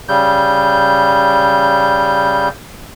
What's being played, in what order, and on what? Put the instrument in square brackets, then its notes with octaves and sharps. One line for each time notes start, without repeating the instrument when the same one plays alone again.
[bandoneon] C#3 G3 G6